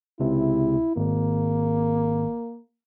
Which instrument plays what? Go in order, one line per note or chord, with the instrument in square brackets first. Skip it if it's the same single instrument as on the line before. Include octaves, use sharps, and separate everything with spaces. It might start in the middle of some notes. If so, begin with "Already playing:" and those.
[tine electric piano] C#2 C3 [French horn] E4
[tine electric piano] G#1 [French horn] A#3